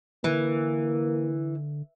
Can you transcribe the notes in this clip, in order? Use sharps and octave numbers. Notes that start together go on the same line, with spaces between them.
D3 E3 A#3